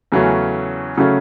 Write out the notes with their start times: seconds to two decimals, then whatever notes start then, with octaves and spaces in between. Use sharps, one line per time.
0.12 E2 C#3 F#3 A3 C#4
0.98 C#3 F#3 A3 C#4